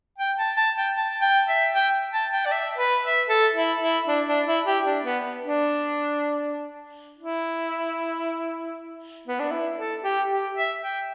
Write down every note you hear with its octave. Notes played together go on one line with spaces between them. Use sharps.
G5
A5
A5
G5
A5
G5
E5
G5
A5
G5
D5
E5
B4
E5
A4
E4
E4
D4
D4
E4
G4
D4
B3
D4
E4
B3
D4
E4
A4
G4
G4
E5
G5